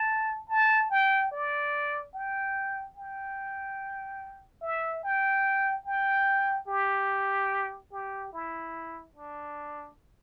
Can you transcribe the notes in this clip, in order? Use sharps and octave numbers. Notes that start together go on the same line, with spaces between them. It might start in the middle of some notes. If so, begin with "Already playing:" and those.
Already playing: A5
A5
G5
D5
G5
G5
E5
G5
G5
G4
G4
E4
D4